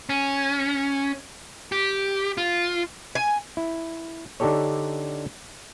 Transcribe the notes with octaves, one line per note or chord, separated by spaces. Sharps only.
C#4
G4
F4
G#5
E4
D3 D4 D#4 G4 A4 C#5